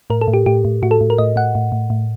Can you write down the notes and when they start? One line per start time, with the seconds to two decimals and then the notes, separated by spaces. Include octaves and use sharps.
0.10 A2 A#4
0.21 A4
0.28 A2
0.34 G4
0.46 A2 G4
0.65 A2
0.82 A2 F#4
0.91 A4
1.01 A2
1.10 A#4
1.18 A2 D#5
1.36 A2 F#5
1.55 A2
1.72 A2
1.90 A2